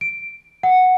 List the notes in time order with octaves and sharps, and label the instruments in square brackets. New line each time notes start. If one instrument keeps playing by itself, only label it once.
[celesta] D7
F#5